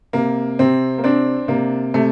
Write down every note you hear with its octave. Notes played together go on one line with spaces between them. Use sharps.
C3 A#3
C3 C4
A#3
C4 D4
C3 A#3
C3 A3